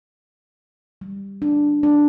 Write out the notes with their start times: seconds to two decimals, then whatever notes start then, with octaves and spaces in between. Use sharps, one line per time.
1.01 G3
1.42 D4
1.83 D4